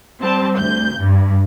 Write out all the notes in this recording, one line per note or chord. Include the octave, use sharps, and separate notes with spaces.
G3 C4 A5
D2 G6
G2